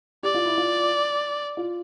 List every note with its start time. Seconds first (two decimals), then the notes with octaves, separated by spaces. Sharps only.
0.23 G4 D5
0.34 F4
0.46 E4
0.58 F4
1.57 F4